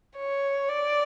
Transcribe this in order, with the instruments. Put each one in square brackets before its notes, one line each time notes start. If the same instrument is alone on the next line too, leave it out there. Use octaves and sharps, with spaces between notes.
[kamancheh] C#5
D5